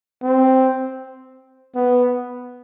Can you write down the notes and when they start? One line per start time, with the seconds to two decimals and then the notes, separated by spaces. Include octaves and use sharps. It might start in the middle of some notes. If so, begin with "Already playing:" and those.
0.23 C4
1.75 B3